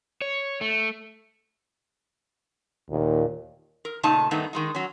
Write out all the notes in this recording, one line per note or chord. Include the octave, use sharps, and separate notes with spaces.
C#5
A3
D#2 A#2
A#4
A#2 C#3 A3 D#4 A5
G2 D#3 A3 B3 D#4
D#3 G#3 D#4
F#3 C#4